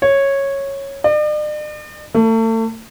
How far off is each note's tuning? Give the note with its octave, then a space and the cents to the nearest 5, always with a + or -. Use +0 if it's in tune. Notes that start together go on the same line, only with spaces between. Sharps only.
C#5 -10
D5 +45
A3 +35